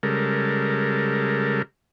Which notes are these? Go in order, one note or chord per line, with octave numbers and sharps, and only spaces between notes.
C#3 G3 G#3 A4 A#4